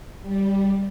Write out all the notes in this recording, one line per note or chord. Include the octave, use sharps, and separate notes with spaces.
G3